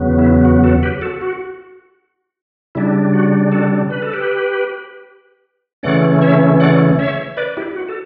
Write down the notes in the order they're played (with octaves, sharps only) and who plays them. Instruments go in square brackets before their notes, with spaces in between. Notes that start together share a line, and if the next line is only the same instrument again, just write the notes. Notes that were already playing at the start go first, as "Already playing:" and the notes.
Already playing: [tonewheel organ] E2 C#3 F#3 B3
E4
F#4
F#4 A4
G4 B4
F#4 A4
F#4
C#3 G3 D4 E4
F#4
F#4 A4
B4
A4
G4 B4
C#3 E3 A3 C#4 D5 F#5
C#5 E5
D5 F#5
C#5 E5
B4 D5
E4 G4
F#4
A4